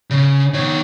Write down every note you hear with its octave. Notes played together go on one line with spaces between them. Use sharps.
C#3
D#3 C#5